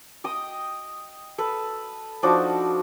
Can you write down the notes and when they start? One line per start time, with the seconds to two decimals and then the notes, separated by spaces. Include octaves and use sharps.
0.24 D#5 G5 D#6
1.38 A4 B4
2.23 F3 D4 D#4 F#4